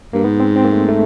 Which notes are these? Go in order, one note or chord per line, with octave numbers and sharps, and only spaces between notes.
G2 A#3
G#2 B3
C4
C4
A#3
A3
A3